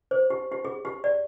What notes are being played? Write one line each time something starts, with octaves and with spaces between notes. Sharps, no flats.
C5
G4
G4
G#4
G4
D5